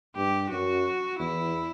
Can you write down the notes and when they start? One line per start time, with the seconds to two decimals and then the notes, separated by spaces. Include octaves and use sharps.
0.16 G2 G4
0.50 F#2 F#4
1.19 E2 E4